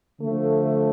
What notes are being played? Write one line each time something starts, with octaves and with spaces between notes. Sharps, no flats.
D3 F3 A3